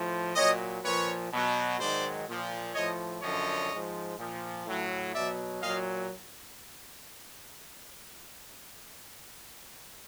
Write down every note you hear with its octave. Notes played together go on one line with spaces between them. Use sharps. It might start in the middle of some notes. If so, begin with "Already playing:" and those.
Already playing: A2 F3
A#2 F#3 C#5 D#5
A#2 F3 B4 C#5
B2 F#3
G#2 D#3 F#3 C5 D5
A#2 F3
A2 F3 C#5 D#5
F#2 D3 F3 C#5 D#5
G#2 F3
A#2 F3
A2 F#3
B2 F#3 D5 E5
A#2 F#3 D#5 F5